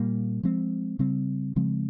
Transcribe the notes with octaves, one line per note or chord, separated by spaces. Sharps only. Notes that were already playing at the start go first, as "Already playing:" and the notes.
Already playing: A#2 G3 A#3
F3 G#3 C4
C#3 G3 C4
C#3 F3 G#3 C4